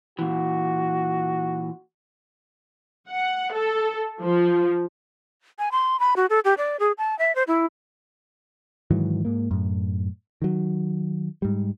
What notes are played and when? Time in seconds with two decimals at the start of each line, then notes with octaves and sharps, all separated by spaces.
0.19 A#2 E3 F#4
3.09 F#5
3.53 A4
4.21 F3
5.59 G#5
5.72 C6
6.00 B5
6.16 F#4
6.30 A4
6.45 G4
6.58 D5
6.80 G#4
6.98 A5
7.19 E5
7.36 C5
7.48 E4
8.91 G#2 D#3 E3 F#3
9.25 G#2 A#3
9.51 F#2 A2
10.42 D#3 F#3
11.42 G#2 G3